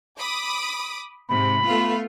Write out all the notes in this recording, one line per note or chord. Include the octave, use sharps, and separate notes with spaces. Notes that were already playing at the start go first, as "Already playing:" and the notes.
B5 D6 D#6
G#2 C3 B5
A3 B3 F4